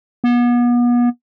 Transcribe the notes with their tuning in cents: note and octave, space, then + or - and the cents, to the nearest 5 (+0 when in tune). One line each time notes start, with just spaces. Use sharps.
B3 -35